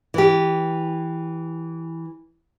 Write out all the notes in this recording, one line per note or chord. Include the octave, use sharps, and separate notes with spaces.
E3 G4